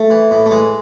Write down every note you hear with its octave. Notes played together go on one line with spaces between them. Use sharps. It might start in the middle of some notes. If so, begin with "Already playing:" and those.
Already playing: A3
E3
A2
A3
E3 G#3